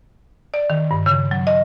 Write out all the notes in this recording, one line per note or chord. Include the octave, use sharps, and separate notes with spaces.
D5
D#3
G2
C#3
F#3
D#5